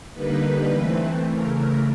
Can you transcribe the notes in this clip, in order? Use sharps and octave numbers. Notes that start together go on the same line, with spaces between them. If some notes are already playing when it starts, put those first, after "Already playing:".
D3 G3 A#3 D#4 B4
E3 A3 C4
C#3 E3 A3 A#4
A#4